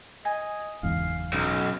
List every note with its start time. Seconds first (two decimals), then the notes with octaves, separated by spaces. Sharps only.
0.25 D#5 G#5
0.83 F#1 E2 G#2 F5
1.33 B1 C#4